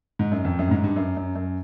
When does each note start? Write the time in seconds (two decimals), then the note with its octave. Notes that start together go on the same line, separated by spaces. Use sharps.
0.19 G#2
0.32 F#2
0.45 F2
0.59 F#2
0.68 A2
0.71 G#2
0.84 G2
0.97 F#2
1.17 F#2
1.35 F#2